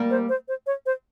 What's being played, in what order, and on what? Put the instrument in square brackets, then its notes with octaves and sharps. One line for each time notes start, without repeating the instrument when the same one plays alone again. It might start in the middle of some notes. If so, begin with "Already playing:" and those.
Already playing: [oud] G3 A#3
[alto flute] C5
C5
C5
C#5
C5